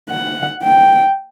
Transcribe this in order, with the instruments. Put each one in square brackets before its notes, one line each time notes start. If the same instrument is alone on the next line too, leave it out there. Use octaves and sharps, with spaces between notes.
[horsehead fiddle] F#5
G5